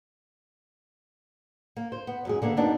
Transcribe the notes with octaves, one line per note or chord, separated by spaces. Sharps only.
A#3
C5
B3
F#2 G#3 G#4
D3 A#3 B3
F#2 B3 D4 D#4